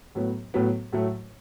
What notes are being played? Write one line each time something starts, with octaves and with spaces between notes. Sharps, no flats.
A2 F#3 B3
A2 F#3 B3
A2 F#3 A3